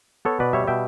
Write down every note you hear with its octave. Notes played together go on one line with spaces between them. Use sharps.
B3 A4 C#5
B2 B4 D5
G3 C#5 E5
B2 E5 G5